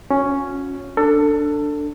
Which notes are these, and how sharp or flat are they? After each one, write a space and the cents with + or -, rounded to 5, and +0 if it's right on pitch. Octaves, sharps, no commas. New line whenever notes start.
C#4 +0 F#4 -40
D4 +0 A4 +20